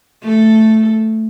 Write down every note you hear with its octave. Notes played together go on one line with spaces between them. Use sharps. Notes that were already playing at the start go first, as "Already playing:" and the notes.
A3 A4